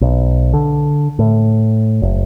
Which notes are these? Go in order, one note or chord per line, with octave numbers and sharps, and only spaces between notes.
B1
D3
A2
F#1